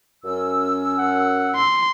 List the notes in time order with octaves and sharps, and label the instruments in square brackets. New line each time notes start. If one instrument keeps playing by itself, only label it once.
[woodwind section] F#2 C#4 E6
[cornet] F#5
[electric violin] C6